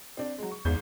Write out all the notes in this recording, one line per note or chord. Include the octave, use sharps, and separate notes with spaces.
C4 D4
F#3 G#3
C#6
G#1 E2 G#2 G6